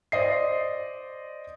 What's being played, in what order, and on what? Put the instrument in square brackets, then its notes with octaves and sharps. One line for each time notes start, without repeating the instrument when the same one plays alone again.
[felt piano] C5 D5 D#5 C7